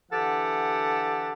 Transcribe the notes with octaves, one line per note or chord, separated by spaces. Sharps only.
D3 E3 G4 A4 F#5